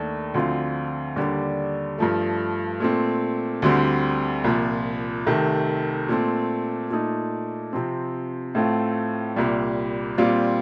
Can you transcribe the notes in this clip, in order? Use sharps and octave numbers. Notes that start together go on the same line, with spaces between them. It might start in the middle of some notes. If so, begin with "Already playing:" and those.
Already playing: D#2 D#3 A3 D4
D2 D3 F3 C4 F4
D#2 D3 G3 D4
G2 F3 A3
A#2 A3 C4
D2 D3 G3 C4
C2 A#2 F3
C2 C3 D#3 A3
A#2 A3 C4
A#2 A3 D#4
C3 F3 C4
A2 A3 C4 F4
C2 A#2 G3
A#2 G3 C4 F4